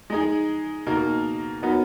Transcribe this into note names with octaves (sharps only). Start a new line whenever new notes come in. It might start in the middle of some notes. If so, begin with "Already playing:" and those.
G#3 D#4 G#4
B2 A#3 D#4 A#4
F#3 B3 D#4 F#4 A#4